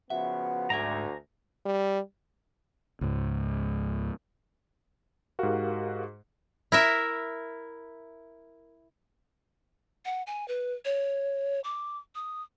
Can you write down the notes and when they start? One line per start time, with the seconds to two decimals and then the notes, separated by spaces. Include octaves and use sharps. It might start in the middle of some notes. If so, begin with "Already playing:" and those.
0.10 C#3 F3 B3 F#4 E5
0.70 D2 G#2 D5 E5 G#5 A#5
1.66 G3
3.01 C#2 G#2
5.39 G#2 F#4 G4 A#4 F5
6.72 E4 A#4 E5
10.05 F#5
10.27 G#5
10.48 B4
10.85 C#5
11.64 D6
12.15 D#6